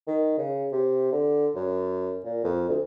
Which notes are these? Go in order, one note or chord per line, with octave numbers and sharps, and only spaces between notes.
D#3
C#3
C3
D3
F#2
A#2
F2
D2